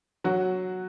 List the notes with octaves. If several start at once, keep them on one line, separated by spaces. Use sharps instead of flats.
F#3 F#4